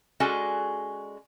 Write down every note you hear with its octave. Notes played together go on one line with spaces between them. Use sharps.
G#3 C#4 F#4 A4 D5 G#5